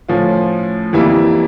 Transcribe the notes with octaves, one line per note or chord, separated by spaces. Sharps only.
A2 F3 C#4 F4
F2 E3 G3 A#3 E4